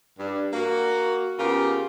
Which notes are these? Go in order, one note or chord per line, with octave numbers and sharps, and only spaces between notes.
G2
A#3 F#4
C#3 B3 F4 G4 A#4